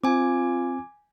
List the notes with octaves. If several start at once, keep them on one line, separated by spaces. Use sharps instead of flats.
C4 F4 G#5 D6